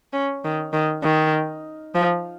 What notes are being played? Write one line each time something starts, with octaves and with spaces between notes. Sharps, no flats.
C#4
D#3
D#3
D#3
F3